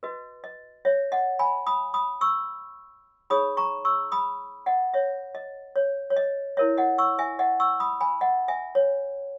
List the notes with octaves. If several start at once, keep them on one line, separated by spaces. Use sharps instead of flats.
F#4 B4 D#5
D#5
C#5 E5
D#5 F#5
G#5 B5
B5 D#6
B5 D#6
C#6 E6
D#4 G#4 C#5 B5 D#6
A#5 C#6
C#6 E6
B5 D#6
D#5 F#5
C#5 E5
D#5
C#5
C#5
D#5
E4 A#4 C#5 E5
D#5 F#5
C#6 E6
E5 G#5
D#5 F#5
C#6 E6
B5 D#6
G#5 B5
D#5 F#5
E5 G#5
C#5